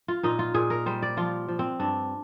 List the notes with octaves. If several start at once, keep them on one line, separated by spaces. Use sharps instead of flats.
F4
A#2 D#4
F4
A#2 G#4
A#4
G3 C5
D5
F3 F4
F3
C4
G2 D4